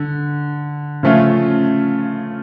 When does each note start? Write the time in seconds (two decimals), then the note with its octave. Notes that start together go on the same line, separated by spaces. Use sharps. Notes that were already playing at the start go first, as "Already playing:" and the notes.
Already playing: D3
1.03 C#3 F3 A3 C#4 F4